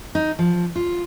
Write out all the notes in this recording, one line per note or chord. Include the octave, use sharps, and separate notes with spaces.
D#4
F3
F4